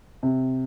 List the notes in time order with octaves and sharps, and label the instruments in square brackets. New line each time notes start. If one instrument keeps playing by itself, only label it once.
[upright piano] C3